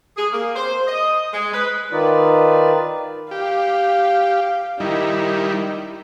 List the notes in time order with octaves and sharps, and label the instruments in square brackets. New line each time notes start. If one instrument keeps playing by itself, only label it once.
[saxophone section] G#4
A#3
C5
D#5
G#3
B4
[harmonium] D#3 D#4 F4 B4 D5
[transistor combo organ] G4 [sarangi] F5
[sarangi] D#3 [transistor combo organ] G3 D#4 E4